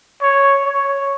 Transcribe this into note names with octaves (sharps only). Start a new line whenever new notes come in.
C#5
C#5